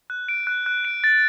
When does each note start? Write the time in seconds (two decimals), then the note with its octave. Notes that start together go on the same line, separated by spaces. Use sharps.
0.10 F#6
0.29 D7
0.47 F#6
0.66 F#6
0.85 D7
1.04 A6